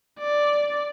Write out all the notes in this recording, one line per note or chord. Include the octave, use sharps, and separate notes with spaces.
D5